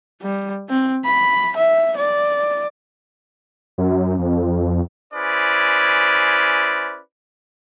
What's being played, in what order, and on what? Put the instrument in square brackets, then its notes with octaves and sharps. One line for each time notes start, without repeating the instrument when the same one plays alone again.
[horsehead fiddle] G3
C4
B5
E5
D5
[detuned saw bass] F#2
F2
[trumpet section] C#4 E4 G#4 B4 C5 D5